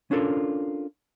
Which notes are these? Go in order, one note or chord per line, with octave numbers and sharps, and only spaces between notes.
C#4 D4 F4 A4 A#4